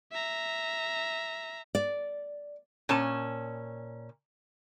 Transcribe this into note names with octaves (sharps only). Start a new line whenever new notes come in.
E5 A#5
D5
A#2 C#4 A5